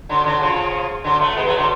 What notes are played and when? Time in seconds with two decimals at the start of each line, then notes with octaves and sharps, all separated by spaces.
0.09 D3 F#3
0.25 D3 F#3
0.41 C#3 F3
1.04 D3 F#3
1.21 F#3 A3
1.36 G#3 B3
1.47 F#3 A3
1.58 D3 F#3